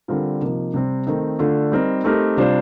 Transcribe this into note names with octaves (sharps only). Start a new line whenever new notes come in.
D3 G3 C4 F4 A#4
C3 F3 A#3 D#4
C3 G3 C4
D#3 A3 C4 D#4
D3 A3 D4 F4
G3 C4 D#4 A#4
A3 C4 D#4 G4 A#4
C3 G3 D4 F4 C5